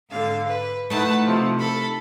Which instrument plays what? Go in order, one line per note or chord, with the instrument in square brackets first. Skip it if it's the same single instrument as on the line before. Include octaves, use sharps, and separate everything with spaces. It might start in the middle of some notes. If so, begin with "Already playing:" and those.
[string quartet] G#2 D3 F5
B4
[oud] A3 D#4 E4 [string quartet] B4 F#5 A5
[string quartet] C3 F3
A4 B5